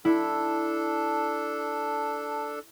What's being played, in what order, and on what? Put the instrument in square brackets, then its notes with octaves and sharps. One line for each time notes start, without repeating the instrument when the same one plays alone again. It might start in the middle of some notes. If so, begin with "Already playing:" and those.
[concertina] D4 A4 [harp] E4